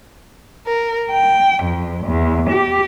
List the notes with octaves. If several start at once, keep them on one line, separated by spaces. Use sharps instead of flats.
A#4
G5
F2
E2
G4